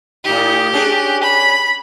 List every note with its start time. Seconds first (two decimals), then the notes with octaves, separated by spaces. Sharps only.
0.25 A2 D#4 G4
0.73 C#4 D4 G#4
1.23 B5